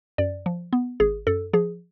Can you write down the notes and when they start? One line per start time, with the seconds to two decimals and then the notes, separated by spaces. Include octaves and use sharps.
0.18 F#2 D5
0.46 F3
0.73 B3
1.00 G#1 G#4
1.27 F#2 A4
1.53 F3 G#4